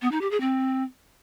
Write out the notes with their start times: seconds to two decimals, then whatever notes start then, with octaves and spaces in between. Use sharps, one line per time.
0.02 B3
0.11 D#4
0.21 G4
0.31 G#4
0.40 C4